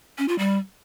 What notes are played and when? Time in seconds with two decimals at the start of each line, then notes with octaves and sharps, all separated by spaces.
0.18 C#4
0.28 F4
0.39 G3